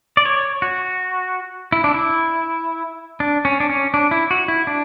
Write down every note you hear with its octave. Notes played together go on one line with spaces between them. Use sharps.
D5
C#5
F#4
E4
D4
E4
D4
C#4
D4
C#4
D4
E4
F#4
E4
D4